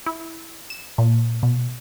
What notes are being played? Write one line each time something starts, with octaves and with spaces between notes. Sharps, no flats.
E4
E7
A#2
B2